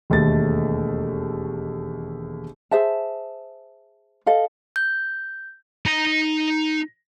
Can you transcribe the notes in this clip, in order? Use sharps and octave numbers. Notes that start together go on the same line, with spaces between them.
E1 D#2 A3 A4 A6
G#4 C5 E5 A5
A4 D#5 F5
G6
D#4 A#5